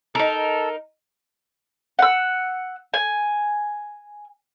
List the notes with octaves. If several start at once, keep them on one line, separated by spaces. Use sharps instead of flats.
D#4 A4 A#4
F#5 E6
G#5